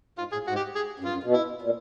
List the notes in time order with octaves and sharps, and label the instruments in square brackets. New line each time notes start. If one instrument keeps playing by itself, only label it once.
[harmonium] G#2 [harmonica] F4
[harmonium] A2 [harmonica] G#4
[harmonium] G#2 [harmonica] F#4
[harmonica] G4
G#4
[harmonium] F#2
[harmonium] G2 [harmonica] F4
[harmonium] F#2
B2
[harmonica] E4
[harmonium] A#2